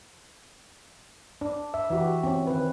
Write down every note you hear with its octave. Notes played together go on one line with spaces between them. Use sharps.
D4
E5
E3 F#4 G4
C4 C#4
D#3 C4 B4